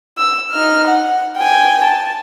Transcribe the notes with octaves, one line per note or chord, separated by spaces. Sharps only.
E6
D#4 F6
F#5
G5 G#5
A5